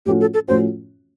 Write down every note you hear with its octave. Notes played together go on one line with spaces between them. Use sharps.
A2 F3 A3 C#4 F#4 G4
A4
A4
A2 F3 A3 C#4 F#4 C5